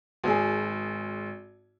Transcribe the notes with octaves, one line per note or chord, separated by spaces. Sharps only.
G#1 G#4